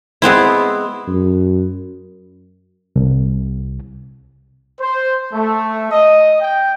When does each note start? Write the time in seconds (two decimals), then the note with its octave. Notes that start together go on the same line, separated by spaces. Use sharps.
0.22 G#3 B3 C4 E4
1.08 F#2
2.96 C2
4.80 C5
5.32 A3
5.91 D#5
6.41 G5